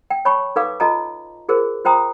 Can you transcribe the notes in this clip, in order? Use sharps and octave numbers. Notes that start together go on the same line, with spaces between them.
G5
C#5 A5 B5 C#6
D#4 A4 B4 F5 D6
F4 A4 D#5 A5 A#5
F4 G#4 A#4 C5
F4 C5 G5 A#5 D#6